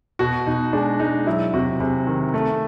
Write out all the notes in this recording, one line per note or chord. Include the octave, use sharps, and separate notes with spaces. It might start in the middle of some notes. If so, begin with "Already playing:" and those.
B2 F#4
B2 D#4
G#3 D4
G#3 D#4
F#3 E4
C3 F#4
C3 G#4
D#3
A3